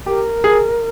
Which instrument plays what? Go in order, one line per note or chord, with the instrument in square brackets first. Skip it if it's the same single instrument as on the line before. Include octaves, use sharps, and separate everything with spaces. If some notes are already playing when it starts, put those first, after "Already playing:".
[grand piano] G4 [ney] A#4
[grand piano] G#4